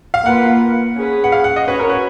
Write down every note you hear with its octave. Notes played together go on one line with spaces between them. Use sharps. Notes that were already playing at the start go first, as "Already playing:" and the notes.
F5
A#3 F4 B4 F#5
C#4 G#4 B4
F#5
F5
F#5
D#5
C#4 F#4 B4 C#5
A#4
B4